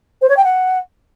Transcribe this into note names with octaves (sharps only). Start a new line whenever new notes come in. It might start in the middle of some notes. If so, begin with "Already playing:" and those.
C5
C#5
G5
F#5